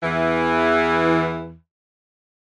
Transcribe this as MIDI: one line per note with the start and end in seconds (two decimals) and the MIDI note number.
0.03 1.54 40
0.03 1.54 52